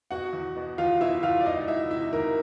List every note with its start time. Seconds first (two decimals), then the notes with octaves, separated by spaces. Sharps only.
0.11 B2 F#4 F#5
0.33 E2
0.56 B2
0.78 E2 F4 F5
1.00 B2 E4 E5
1.23 E2 F4 F5
1.41 D5
1.45 C#2 D#4 D#5
1.67 C#2 E4 E5
1.90 C3 E4 E5
2.13 D#3 A#3 A#4